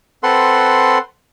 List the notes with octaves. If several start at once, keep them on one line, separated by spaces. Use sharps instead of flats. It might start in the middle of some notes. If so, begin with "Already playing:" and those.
C4 A4 B4 F#5 C6